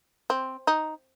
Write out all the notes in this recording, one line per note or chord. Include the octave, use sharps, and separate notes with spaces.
C4
D#4